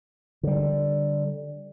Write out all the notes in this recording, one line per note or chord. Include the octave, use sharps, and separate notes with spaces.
D3 G3